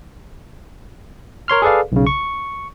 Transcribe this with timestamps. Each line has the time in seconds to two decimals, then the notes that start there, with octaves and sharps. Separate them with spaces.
1.48 A#4 C#5 C6 F6
1.62 G#4 A4 B4 D5 F5
1.92 B1 C#3
2.07 C#6